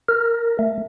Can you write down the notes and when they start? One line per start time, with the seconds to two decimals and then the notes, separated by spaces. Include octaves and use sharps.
0.09 A#4
0.59 A3